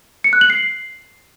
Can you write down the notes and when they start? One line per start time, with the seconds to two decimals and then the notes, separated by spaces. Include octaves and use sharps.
0.24 C#7
0.33 F#6
0.41 F#7
0.50 C7